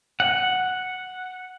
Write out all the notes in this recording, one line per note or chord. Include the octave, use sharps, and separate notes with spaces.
F#5